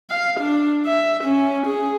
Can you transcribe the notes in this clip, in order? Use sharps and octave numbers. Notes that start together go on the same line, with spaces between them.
F5
D4
E5
C#4
G#4